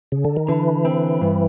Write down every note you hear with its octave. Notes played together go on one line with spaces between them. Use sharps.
C#3
D3
D#3
D3 E3
C4
G2